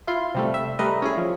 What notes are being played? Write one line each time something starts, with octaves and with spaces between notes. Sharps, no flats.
E4 F4 C6
C3 G3 A3
E5
G3 A3 A#4 B4 D#5
C#4 E4 G#4
F3